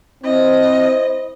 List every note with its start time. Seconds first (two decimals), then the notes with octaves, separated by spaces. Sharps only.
0.24 C4 E4 C5 D#5